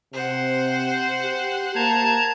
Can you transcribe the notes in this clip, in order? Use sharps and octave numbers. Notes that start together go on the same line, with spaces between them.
C3 C5 F#5
G4
A#3 A5 A#5 G#6